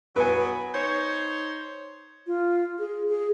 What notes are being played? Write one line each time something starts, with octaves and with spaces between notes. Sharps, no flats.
F#3 B3 B4 G#5
D#4 C5 C#5
F4
G#4
G#4